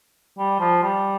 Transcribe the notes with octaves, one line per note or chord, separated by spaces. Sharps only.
G3
F3
G3